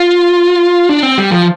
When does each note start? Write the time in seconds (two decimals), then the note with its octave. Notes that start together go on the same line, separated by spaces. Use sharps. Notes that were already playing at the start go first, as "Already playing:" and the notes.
Already playing: F4
0.89 D4
1.03 C4
1.18 G3
1.31 F3